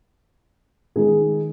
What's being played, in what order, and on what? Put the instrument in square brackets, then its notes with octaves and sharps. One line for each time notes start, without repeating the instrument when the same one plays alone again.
[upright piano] D#3 G#3 D#4 G#4